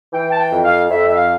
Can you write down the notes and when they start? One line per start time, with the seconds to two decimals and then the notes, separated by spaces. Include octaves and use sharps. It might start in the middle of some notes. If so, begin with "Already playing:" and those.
0.13 E3 G5
0.31 A5
0.39 G5
0.51 F2
0.64 F5
0.89 F2 E5
1.06 E5
1.15 F5